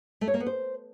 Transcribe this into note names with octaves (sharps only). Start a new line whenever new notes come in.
A3
C#5
A#3
B3
C5